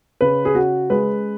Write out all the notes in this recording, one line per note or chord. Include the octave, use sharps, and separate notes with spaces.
C#3 B4
G#4
C#4 F#4
G#3 B4